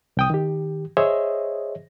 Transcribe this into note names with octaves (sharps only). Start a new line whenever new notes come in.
C2 G5 D#6
D#3 G4
G#4 C5 C#5 D#5 E5